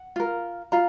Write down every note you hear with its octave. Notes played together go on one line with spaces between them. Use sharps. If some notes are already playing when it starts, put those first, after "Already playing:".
Already playing: F#5
F4 A#4
F4 A#5